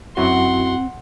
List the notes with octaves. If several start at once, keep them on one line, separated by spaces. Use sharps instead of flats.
F#2 C4 E4 F#4 F#5 C6